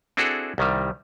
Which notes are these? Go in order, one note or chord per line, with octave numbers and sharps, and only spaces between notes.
C4 D4 E4 F#4 G#4 A4
C2 D#3 G3